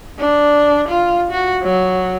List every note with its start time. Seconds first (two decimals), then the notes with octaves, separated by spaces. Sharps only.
0.19 D4
0.88 F4
1.31 F#4
1.63 F#3